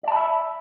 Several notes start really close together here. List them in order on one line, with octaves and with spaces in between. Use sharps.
D5 A5 B5 E5